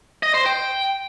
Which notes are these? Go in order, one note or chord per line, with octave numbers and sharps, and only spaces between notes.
D#5
C5
G5